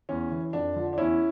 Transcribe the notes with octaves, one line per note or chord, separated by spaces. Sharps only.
E2 C#4
E3
F2 D4
D3 F3
D4
E2 C#4 E4